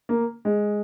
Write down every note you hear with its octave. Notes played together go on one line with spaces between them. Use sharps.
A#3
G#3